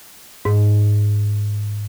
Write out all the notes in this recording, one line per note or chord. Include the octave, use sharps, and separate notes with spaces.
G#2